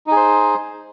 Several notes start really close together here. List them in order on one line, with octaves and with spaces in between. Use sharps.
D#4 G#4 C5